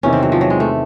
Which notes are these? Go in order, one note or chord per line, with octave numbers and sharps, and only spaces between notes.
E2 C3 D#3 C#4
C4
F#3
F3
F#3
G#3
A3